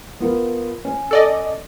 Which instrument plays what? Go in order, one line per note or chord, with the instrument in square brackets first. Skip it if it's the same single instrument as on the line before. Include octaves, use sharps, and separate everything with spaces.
[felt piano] B3 F4 A#4
C#4
[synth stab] A4 D5 D#5